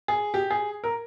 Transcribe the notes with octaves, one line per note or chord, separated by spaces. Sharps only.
G#4
G4
G#4
A#4